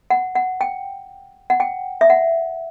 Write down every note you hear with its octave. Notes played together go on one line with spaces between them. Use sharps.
F#5
F#5
G5
F#5
G5
E5
F#5